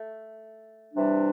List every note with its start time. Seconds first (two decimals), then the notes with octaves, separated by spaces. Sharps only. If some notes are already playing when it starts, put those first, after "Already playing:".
Already playing: A3
0.94 C3 E3 G3 D4